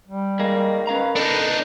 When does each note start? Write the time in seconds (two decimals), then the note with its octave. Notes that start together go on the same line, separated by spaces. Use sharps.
0.08 G3
0.40 D#3 G#3 A#3
0.87 C#4 B4 F5 A#5
1.16 D4 D#4 A4